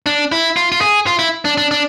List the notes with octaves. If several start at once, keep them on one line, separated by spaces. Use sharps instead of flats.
D4
E4
F4
F4
G#4
F4
E4
D4
D4
D4